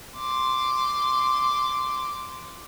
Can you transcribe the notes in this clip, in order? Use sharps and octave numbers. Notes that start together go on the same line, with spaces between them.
C6 D6